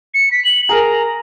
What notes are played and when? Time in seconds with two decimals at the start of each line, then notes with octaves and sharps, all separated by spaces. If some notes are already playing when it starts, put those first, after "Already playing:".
0.14 C#7
0.32 B6
0.45 F#7
0.69 G#4 A#4 A#5